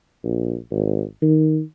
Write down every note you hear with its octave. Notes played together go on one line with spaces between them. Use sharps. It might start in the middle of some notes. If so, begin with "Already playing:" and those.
A#1
G#1
D#3